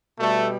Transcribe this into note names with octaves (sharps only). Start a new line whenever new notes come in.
B2 G3 A3